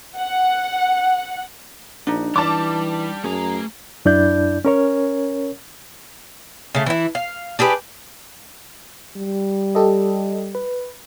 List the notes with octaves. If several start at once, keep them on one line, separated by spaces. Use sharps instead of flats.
F#5
A#1 D4 D#4
E3 G3 A5 D6
F#2 A3 G#4 A#5
F#2 D4 E4 D5 G6
C#4 A#4 C#5
C#3 A3
E3 E4
F5
D4 G4 G#4 B4
G3
G4 A4 D#5
B4